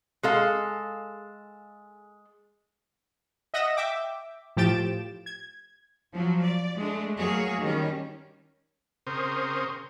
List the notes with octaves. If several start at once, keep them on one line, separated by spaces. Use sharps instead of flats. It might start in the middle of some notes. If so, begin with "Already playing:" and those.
G#3 A4 F5
D#5 E5 F#5 D#6 E6 A#6
E5 G5 D6
A2 F3 G4 A6 D7 E7
G#6
F3 F#3
D5
G#3 A3 D4
F#3 A3 A#3 F#4 G#4 C#5
D#3 G3 C#4
C#3 C4 A#4 C5 C#6 D#6